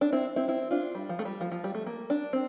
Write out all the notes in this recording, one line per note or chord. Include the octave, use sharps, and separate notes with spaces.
D4
C4 E4
C4 E4
C4 E4
D4 F4
G3
F3
A3
G3
F3
F3
G3
A3
A#3
D4
C4